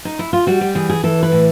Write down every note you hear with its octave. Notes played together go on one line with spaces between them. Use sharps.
D#4
E4
F4
G3 F#4
G4
E3 G#4
G#4
E3 A4
B4
A2